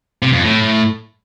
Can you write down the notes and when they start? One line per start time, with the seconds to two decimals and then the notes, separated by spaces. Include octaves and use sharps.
0.22 C3
0.33 F2
0.43 A2